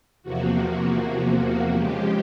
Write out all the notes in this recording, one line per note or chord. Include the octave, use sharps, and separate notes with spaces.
E2 C3 F3 A#3 F#4
F#4
C#3 F3 G#3 G4